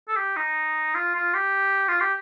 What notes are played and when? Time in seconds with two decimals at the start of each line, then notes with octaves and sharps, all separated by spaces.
0.08 A4
0.16 G4
0.36 D#4
0.95 F4
1.15 F4
1.34 G4
1.88 F4
2.00 G4